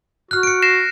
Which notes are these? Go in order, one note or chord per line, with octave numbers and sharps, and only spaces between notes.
F#4 F6 F#6
C#7 D7
A#6 C7 E7